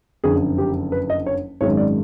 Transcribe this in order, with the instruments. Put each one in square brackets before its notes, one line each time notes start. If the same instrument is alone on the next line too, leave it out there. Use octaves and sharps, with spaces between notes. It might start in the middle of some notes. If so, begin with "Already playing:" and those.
[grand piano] F#1 F2 D3 G#4
G4
B4
D#5
C#5
G#1 F#2 D#3 G#3 C#5
D5